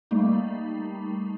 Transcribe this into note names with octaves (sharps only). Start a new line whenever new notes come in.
G3 A3 A#3 D#4